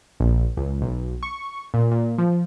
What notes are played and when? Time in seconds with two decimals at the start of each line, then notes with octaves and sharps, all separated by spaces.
0.20 A#1
0.57 C#2
0.81 B1
1.23 C#6
1.74 A#2
1.92 A#2
2.18 F3